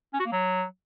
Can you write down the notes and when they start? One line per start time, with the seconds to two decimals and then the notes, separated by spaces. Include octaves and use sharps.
0.13 C#4
0.20 F#4
0.26 A#3
0.32 F#3